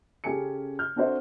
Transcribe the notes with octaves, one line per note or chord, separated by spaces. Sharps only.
C#3 C#4 G4 A4 G#5 C#7
F6 G6
C4 D4 F#4 A4 C5 E5